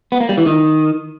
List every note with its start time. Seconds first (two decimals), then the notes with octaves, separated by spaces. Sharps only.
0.12 B3
0.20 A#3
0.29 G3
0.38 E3
0.46 D#3